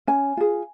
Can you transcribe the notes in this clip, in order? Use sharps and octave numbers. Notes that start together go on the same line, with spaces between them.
C#4 G#5
F4 G#4